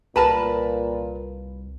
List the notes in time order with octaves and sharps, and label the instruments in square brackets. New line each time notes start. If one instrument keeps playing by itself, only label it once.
[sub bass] C2 [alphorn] A#2 [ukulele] A#4 A5 B5 [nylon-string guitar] B4